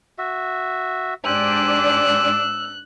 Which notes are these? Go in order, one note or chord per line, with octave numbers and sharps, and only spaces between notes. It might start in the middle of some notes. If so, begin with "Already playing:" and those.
F#4 E5
G#2 D4 G4 C5 D5 G#5 E6 F#6